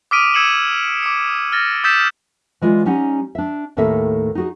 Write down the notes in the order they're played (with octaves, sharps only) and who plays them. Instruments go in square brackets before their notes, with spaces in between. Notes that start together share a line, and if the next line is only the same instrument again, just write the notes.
[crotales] D6 D#6 F6 B6 D7 D#7
E6 G#6 C#7 E7 F#7
D6 C#7
F6 A6 A#6
D#6 E6 G6 A6 B6 E7
[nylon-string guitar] E3 G#3 F4 D5
G3 C#4 D#4 F#5
D4 E5
D#2 A2 D#3 A#3 A4 E5
D#4 F#4 G#4